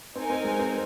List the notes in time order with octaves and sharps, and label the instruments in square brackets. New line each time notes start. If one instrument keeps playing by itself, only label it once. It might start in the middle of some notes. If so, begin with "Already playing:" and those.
[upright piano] C4 [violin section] D#4 A#4 G#5
[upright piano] C4
G#3
C4